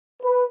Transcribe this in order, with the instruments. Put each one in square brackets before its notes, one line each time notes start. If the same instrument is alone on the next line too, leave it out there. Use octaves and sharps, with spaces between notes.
[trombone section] B4